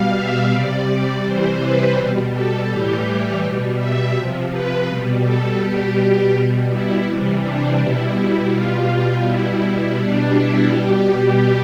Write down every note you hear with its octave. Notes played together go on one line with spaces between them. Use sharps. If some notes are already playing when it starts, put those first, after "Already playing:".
Already playing: B2 G3 F5
E5
C3 G3 D5
C3 E3 G3 C5
B4
B2 G3
A4
A2 E3 G3 G4
B2 G3
E5
C3 F3
B4
B2 G3
A4
B2 G3 G4
B2 G3
E4
C3 E3 G3
D4
B2 G3 E4
B2 G3 F4
B2 G3 E4
E4
B2 G3 D4
E4
B2 G3 G4